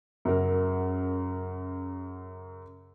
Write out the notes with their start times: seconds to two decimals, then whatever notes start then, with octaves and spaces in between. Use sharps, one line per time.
0.25 F#2 C#3 F#3 A#4